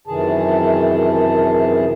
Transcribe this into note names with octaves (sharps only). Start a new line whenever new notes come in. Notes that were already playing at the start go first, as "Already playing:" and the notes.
F#2 C3 D#3 E3 G#4 A5